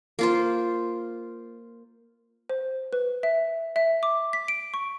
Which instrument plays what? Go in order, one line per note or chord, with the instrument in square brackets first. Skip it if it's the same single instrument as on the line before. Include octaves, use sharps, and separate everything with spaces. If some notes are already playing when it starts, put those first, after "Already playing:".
[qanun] A#3 F4 C5
[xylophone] C5
B4
E5
E5
D6
B6
D7
C#6